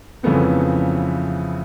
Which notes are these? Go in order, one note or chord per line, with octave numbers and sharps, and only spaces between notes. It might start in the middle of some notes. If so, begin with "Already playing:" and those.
F2 C#3 E3 A3 B3 C4